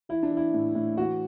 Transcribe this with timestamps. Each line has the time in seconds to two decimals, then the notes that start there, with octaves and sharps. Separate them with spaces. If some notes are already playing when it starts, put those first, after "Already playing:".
0.09 E3 E4
0.23 D4
0.31 E3
0.37 E4
0.54 A2
0.75 A2
0.97 E3 F#4